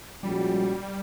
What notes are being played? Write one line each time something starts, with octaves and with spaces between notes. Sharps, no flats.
A#2 F3 G3 G#3 C#4 F#4